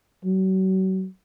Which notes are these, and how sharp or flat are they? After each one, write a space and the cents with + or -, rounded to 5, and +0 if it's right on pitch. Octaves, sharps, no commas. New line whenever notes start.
F#3 +35